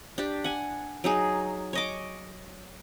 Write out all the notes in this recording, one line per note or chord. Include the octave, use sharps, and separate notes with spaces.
D4 G4
F#5 G#5
F#3 D#4 G#4
C#5 D#5 D6